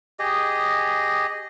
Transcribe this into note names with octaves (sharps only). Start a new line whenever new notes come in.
G4 G#4 D#5